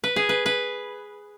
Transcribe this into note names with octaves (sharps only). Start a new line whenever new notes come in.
B4
G#4
B4
B4